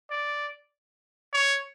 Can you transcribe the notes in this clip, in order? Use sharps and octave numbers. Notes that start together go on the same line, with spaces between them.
D5
C#5